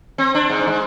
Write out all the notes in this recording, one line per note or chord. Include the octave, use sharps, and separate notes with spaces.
C4
D4
G#2
G#3